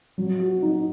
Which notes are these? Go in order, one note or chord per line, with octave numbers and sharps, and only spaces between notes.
F#3
F#4
D#4